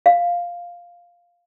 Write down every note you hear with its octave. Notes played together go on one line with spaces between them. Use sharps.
F5